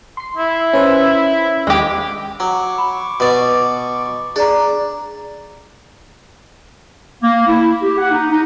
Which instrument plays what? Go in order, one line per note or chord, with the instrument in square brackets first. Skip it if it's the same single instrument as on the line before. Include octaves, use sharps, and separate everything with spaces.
[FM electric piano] C6 C7
[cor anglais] E4
[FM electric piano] C#4 B4 C5
[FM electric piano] D#2 [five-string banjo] G#3 G4
[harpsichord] F#3 [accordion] C#6 D6
[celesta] B5
[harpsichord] B2 D5
[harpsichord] D4 [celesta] G#4 D5 A#5
[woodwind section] A#3
E4
G4
F#5
D#4
D#4